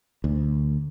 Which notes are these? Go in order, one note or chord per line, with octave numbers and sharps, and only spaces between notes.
D2